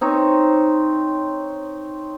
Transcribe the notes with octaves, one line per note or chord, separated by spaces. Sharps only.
C4 D#4 C#5